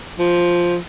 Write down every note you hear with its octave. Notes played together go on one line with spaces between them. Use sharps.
F3